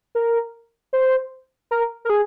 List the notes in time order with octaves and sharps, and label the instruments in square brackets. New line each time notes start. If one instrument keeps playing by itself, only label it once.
[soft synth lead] A#4
C5
A#4
A#4
G#4